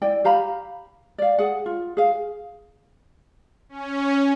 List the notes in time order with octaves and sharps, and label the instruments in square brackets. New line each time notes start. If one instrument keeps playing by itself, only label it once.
[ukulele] E4 D5 G5
G4 F5 A#5 B5
D5 F5
G#4 F#5
F4
G#4 F5
[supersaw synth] C#4